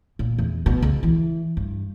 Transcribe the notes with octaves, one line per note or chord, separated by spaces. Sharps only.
A#2
E2
B2
C#2
E3
G2